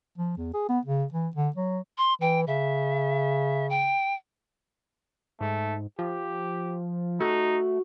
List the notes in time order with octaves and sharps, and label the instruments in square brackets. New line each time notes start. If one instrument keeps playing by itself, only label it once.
[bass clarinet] F3
E2
G#4
B3
C#3
E3
D3
F#3
[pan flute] C6
[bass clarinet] E3 [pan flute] G5
[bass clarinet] C#3 [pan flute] E5
[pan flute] G5
[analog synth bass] G#2 [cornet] A3
[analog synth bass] F3 [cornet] G4
[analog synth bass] A3 [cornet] D#4 [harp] F#4